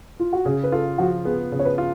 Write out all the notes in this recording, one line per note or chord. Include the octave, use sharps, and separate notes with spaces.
F4
F#4
C#3 G#4
B4
F4 A4
F3 F#4
B3 G#4
C#3
C#5
B4
F4